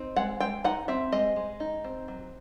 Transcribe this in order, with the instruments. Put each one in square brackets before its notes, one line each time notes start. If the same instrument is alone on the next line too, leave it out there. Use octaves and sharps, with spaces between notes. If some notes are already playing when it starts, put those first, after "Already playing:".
Already playing: [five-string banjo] C4 D#4
G#3 F#5
G#3 G5
D#4 F#5
C4 E5
G#3 D#5
G#3
D#4
C4
F#3